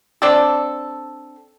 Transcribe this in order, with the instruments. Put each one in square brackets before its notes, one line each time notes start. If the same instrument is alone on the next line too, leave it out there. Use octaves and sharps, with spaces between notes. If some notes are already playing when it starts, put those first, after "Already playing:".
[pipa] C4 D4 A4